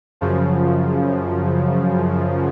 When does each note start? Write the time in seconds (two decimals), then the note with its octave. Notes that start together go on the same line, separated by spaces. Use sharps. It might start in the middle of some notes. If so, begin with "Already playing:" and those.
0.21 F#2 C#3 F3